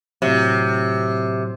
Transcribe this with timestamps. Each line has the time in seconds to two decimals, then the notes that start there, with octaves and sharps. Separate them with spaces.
0.22 A2 C3 F#3